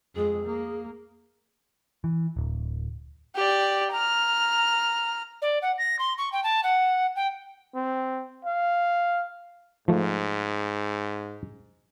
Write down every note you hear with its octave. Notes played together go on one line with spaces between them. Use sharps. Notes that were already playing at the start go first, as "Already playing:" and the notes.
F2 G#3 G#4
A#3
E3
D1
G4 D5
A#5 F6
D5
F#5
A#6
C6
C#6
G5
A5
F#5
G5
C4
F5
G#2 F3 A3